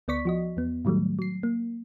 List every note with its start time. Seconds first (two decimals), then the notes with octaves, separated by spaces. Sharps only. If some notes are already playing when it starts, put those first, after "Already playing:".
0.08 D2 B3 D5 C#6 B6
0.25 F3 F#4 D#5
0.57 E2 B3
0.85 A2 D#3 F#3 G3 A3
1.19 F#3 C7
1.43 A#3